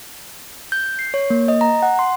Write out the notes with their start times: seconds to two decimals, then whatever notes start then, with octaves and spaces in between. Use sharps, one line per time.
0.72 G6
0.99 C7
1.14 C#5
1.30 A#3
1.48 D#5
1.61 A#5
1.82 F#5
1.99 C6